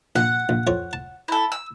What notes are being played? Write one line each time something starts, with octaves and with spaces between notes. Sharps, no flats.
A#1 F#5
A#1
F2 C#5
A5
E4 A4
E6